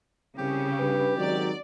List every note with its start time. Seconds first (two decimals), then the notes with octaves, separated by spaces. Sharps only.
0.38 C2 C#3 G4
0.80 G2 B4
1.17 G#1 D#3 F#3 D5